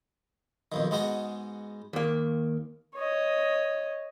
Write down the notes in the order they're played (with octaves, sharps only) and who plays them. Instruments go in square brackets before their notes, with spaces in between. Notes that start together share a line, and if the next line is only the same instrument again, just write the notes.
[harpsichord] B1 F2 D#3
G#2 G#3 B3 F#4 D#5
[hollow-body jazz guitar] D#2 A#3
[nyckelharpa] C#5 D#5